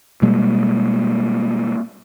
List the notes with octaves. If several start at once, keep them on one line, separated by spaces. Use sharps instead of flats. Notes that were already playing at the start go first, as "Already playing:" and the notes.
B2 G3 G#3 A#3